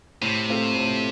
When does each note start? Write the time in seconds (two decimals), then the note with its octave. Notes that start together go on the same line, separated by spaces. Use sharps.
0.22 A2 C3
0.49 A3 C4 F4 A4
0.75 A2